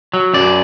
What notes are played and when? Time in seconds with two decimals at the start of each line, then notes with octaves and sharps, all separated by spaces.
0.13 F#3
0.34 F#2 D5